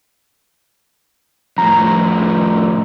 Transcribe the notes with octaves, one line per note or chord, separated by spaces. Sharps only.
F2 A2 A#5